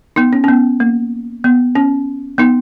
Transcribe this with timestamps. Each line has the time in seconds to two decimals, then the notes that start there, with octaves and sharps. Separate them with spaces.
0.16 B3 D#4
0.33 C#4
0.44 C#4
0.48 B3
0.80 A#3
1.44 B3
1.75 C#4
2.38 B3 D#4